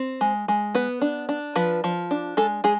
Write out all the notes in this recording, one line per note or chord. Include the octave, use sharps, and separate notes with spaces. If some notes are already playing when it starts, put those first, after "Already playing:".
Already playing: C4
G#3
G#3
B3 B4
D4
D4
F3 B4
F3
D4
G#3 A4
G#3 G#4